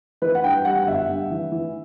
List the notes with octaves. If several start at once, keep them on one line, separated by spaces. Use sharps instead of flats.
E3 B4
F#5
G2 G5
G3 F#5
F#5
G1 E5
G2
E3
E3